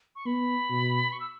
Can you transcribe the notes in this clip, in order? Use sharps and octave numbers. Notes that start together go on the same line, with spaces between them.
C#6
B3 B5
B2
C#6
E6